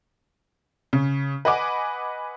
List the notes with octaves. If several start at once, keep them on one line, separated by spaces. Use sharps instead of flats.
C#3
B4 D#5 F#5 G#5 D6